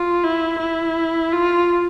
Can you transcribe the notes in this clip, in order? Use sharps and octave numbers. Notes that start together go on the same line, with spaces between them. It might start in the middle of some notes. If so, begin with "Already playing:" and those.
Already playing: F4
E4
E4
F4